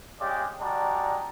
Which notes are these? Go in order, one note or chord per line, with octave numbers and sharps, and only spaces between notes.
G3 G#3 C#4 G4 D5 F5
G3 G#3 F#4 D5 A5 A#5